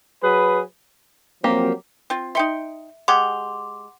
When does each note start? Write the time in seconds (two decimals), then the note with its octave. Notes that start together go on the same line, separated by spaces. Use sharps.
0.23 F#3 G#4 B4
1.44 F3 F#3 A#3 C4 G4
2.10 C4 F4
2.35 D#4 E5 G5 C6 C#7
3.08 G#3 G4 F#5 C6 D6